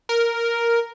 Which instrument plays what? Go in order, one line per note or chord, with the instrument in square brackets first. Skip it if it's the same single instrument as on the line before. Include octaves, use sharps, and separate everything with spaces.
[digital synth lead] A#4